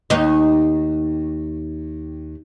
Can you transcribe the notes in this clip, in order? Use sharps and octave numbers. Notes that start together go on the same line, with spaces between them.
D#2 D#4